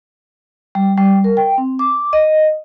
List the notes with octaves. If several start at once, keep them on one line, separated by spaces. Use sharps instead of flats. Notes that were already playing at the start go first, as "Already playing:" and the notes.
G3
G3
A#4
G5
C4
D6
D#5